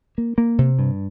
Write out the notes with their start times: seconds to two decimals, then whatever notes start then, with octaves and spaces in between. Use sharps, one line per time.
0.18 A#3
0.38 A#3
0.58 C3
0.79 G2